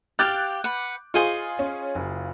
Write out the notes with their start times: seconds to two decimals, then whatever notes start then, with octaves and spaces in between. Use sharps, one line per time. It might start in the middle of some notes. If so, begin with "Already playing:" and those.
0.19 G4 F5 D6 F#6 G6 A6
0.64 B4 F#5
1.14 F4 G#4 C5 D#5 C#6
1.59 C#4
1.95 F#1